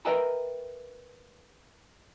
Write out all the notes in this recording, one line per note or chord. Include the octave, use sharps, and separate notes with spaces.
A#4 B4 D#5 E5 G5 A#5